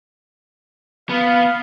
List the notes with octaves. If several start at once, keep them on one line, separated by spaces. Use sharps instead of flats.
B3 F5